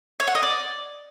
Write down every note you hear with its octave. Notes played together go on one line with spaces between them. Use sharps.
C#5
F#5
D#5
D5